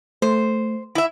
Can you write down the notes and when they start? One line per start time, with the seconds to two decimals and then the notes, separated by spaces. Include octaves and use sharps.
0.22 A3 C5
0.95 E4 E5